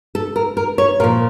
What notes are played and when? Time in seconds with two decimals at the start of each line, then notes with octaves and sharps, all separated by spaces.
0.15 A4
0.36 A#4
0.57 A#4
0.78 C#5
1.00 A#2 A#4
1.04 F3